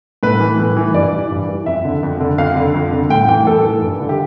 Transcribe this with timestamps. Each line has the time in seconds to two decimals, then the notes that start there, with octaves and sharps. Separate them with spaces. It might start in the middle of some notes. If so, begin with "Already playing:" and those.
0.23 A2 B4
0.40 E3
0.59 A2
0.77 E3
0.94 G2 D5
1.13 E3
1.31 G2
1.49 E3
1.66 F2 E5
1.84 D3
2.03 F2
2.20 D3
2.38 F2 F5
2.56 D3
2.74 F2
2.93 D3
3.10 A2 G5
3.28 E3 G5
3.46 A2 A4
3.64 E3
3.82 G2
4.00 D3
4.09 G4